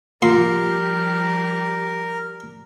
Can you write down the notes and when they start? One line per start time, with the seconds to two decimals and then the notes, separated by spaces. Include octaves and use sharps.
0.22 A#2 F3 G3 G4 A#4 C6